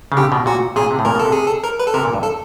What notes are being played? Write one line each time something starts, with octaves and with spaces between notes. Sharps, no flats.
C#3
D3 G4
B2
A#2 F#4
A#2 G#4
C3
A2
A#2 A#4
B2
A4
C3
G#4
A4
A#4
B4
A4
C3 A#4
A#2
G2
A4